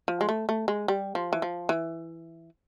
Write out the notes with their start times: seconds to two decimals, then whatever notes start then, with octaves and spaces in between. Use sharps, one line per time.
0.08 F3
0.21 G#3
0.29 A3
0.49 A3
0.68 G#3
0.88 G3
1.15 F3
1.33 E3
1.42 F3
1.69 E3